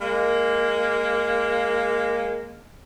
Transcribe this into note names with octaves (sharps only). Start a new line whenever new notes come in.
G#3 A#3